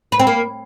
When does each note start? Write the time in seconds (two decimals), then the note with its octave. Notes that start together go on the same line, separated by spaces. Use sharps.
0.12 B4
0.20 C4
0.27 A#3